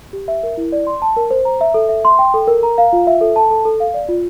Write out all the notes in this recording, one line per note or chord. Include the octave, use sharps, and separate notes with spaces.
G4
E5
A#4
E4
D5
C6
A5
A#4
C5
A#5
E5
A4
E5
C6
G5
A4
A#4
A#5
F5
F4
E5
A4
A5
A4
A4
F5
D5
F4